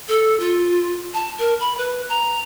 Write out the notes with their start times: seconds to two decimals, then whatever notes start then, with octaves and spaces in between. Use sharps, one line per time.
0.08 A4
0.40 F4
1.14 A5
1.39 A#4
1.60 B5
1.78 B4
2.09 A#5